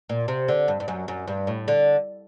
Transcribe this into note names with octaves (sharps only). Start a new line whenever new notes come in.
A#2
C3
D3
G2
G2
F#2
F#2
G2
A2
D3